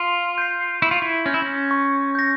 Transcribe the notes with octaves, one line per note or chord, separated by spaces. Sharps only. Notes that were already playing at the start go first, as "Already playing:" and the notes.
Already playing: F4 C6
G6 C7
E4 C#6
F4
E4
C#4 G6 A#6
E4
C#4
C#6
G6 A#6